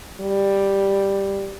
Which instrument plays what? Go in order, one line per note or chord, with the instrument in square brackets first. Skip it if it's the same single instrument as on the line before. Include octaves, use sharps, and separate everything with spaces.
[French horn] G3